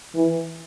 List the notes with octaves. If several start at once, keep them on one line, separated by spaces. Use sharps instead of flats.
E3